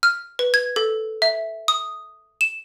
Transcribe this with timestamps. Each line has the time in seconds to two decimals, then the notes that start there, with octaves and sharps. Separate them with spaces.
0.03 F6
0.39 B4
0.54 G#6
0.76 A4
1.22 E5
1.68 D#6
2.41 E7